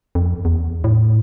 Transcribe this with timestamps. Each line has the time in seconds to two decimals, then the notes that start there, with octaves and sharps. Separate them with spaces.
0.15 F2
0.45 E2
0.84 A2